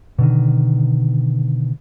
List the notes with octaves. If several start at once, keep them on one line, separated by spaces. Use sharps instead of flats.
B2 D3 D#3